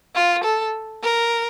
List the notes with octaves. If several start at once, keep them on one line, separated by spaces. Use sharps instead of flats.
F4
A4
A#4